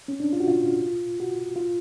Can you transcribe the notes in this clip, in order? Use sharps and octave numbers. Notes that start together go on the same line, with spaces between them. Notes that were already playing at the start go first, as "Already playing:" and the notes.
C#4
D4
F4
F#4
F4
F#4
F4